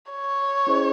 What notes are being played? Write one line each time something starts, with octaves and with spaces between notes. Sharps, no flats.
C#5
C#4 E4 G#4 C5 D#5